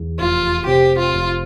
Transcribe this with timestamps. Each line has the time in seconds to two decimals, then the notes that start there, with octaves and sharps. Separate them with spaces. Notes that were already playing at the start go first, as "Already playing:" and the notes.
Already playing: E2
0.20 F1 F4
0.67 C3 G4
0.99 F4
1.14 F1